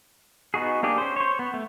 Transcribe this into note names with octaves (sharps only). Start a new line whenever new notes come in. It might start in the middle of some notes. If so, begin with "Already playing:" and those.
B3 D#4 F#4 G#4
A#3 D4 G4 G#4
C#4 C5
C5 C#5
B3
A3